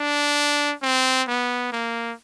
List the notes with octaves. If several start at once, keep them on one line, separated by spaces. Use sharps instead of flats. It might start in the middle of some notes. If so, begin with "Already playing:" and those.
Already playing: D4
C4
B3
A#3